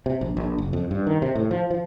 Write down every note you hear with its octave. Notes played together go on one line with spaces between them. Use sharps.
C3
A#1
A#1
F#1
F2
G2
D#3
C3
A2
F3
F3